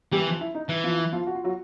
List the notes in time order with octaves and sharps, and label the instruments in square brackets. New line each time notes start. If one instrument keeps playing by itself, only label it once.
[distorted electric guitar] E3 [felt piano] G3 G4
[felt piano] F3 F4
E4
D#4
[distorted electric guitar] E3 [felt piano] E4
[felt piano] F3 F4
E4
F3 F4
F#4
F4
F#3 F#4